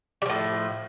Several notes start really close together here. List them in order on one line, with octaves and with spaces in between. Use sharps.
G3 F3 A2